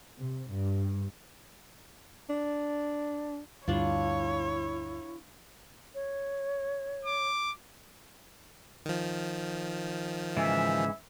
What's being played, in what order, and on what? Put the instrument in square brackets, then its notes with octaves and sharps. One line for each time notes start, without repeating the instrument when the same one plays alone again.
[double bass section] C3
G2
[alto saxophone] D4
[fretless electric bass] D2 G2 [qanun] D4 F4 [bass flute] E4 [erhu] C#5
[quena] C#5
[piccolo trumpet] D6
[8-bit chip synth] D#3 F3
[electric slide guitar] G#2 C#3 E3 [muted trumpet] E5